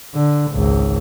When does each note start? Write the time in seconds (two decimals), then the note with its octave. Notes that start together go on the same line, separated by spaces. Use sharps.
0.15 D3
0.53 G#1 C#2